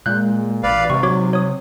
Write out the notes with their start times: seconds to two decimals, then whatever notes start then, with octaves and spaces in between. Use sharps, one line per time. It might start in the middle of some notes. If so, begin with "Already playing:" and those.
0.06 A#2 G#3 F#6 G6
0.63 A1 B4 D5 F5
0.90 G#2 C3 C#6
1.03 F#3 F#4 C#5 D6
1.33 C#5 D#6